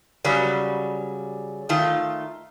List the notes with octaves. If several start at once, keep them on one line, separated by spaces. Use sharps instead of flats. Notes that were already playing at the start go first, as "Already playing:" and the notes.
C#3 F#3 G3
D#3 A3 F4